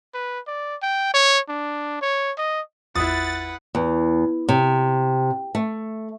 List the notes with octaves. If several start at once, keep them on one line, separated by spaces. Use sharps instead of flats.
B4
D5
G5
C#5
D4
C#5
D#5
G#1 E2 E4 F4 B4 F#5 D#6 A6
E2
C3
A3